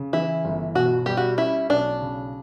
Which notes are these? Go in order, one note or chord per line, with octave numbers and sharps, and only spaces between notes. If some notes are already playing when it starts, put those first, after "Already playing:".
Already playing: C#3
E3 E4
G1
B2 F#4
G3 G4
F#4
C#4 E4
B1 D4
C#3